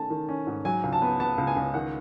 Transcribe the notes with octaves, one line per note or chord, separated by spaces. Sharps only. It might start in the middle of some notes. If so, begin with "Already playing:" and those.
Already playing: D#3 A3 C#4 A5
D#3
C#4
G#2
F#3 G#5
C#2
A5
B3
B3 A5
C#2
G#5
C#2
D#3 F#5